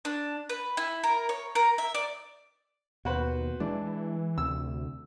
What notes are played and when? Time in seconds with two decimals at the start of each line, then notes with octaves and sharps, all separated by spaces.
0.05 D4
0.49 B4
0.77 E4
1.04 A#4
1.29 C#5
1.55 A#4
1.78 E5
1.94 D5
3.05 D#2 B2 F#4 B4 C5
3.60 E3 G#3 D4
4.38 D2 C3 E6